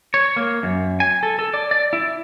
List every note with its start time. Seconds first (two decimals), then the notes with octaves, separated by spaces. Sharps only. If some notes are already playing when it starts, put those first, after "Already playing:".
0.14 C#5
0.36 A#3
0.63 F#2
1.00 G#5
1.23 A4
1.39 A4
1.54 D5
1.71 D5
1.93 E4